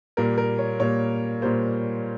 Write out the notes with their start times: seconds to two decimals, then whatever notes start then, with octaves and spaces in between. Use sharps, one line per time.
0.17 A#2 G3 A#3 A#4
0.38 A#4
0.59 C#5
0.80 A#2 G3 A#3 C#5
1.42 A#2 G3 A#3 C5